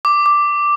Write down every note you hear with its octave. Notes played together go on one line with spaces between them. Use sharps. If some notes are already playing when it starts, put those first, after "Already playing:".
D6
D6